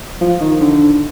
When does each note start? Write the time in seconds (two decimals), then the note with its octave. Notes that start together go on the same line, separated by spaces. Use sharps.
0.21 F3
0.40 D#3
0.61 D3